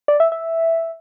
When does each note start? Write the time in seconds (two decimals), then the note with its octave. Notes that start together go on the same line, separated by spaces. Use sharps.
0.08 D5
0.20 E5
0.32 E5